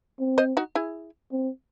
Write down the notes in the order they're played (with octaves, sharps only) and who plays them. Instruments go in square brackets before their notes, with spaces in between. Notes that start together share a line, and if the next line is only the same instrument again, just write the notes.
[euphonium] C4
[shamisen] C5 D#5
D#4 F#4
E4 G#4
[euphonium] C4